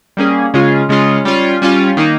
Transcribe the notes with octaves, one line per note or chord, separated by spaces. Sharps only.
G3 A#3 C#4 G#4
C#3 G#3 C#4 F4 G#4
C#3 G#3 C#4 F4 G#4
G3 C#4 F4
G3 C#4 F4
D#3 A#3 D#4